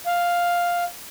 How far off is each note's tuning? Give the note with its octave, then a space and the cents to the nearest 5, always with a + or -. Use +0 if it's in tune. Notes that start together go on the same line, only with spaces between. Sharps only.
F5 +5